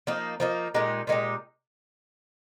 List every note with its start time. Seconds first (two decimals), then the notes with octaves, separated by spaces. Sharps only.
0.07 F3 A#3 D#4
0.40 F3 A#3 D#4
0.74 A#2 G#3 D#4 G4
1.07 A#2 G#3 D#4 G4